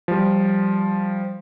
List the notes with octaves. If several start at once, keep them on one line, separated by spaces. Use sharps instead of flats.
F3 G3